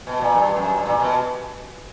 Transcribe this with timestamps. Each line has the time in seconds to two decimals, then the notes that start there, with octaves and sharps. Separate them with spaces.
0.07 B2
0.21 A#2
0.35 G2
0.56 F#2
0.78 G2
0.86 A#2
1.00 B2